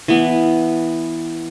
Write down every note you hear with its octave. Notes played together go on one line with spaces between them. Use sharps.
E3 B3